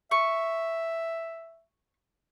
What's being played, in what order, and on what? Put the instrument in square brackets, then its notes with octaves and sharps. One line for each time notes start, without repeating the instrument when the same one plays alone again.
[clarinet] E5 [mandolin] C#6